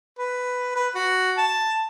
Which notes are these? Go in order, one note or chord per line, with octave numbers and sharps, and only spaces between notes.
B4
B4
F#4
A5